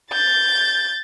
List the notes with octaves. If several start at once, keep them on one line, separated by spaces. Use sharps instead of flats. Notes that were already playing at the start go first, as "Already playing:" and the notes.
G6 A6